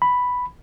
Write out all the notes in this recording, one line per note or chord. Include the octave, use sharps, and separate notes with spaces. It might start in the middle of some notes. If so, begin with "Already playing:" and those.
B5